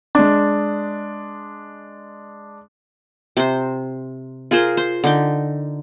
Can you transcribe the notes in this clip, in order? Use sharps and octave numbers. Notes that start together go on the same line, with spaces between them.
G#3 D4
C3 C5
F4 G#4 A#4 C5
C5
D3 D#4 G5